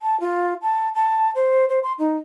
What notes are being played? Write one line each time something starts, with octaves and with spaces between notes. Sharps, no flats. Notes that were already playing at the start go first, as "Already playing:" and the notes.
A5
F4
A5
A5
C5
C5
C6
D#4